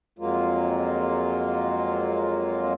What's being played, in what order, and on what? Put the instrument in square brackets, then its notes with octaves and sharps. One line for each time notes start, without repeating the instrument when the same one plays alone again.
[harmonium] F2 F#3 G#3 A#3 F4